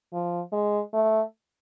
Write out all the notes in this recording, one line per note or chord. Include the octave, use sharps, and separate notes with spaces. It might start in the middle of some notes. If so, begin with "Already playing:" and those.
F3
G#3
A3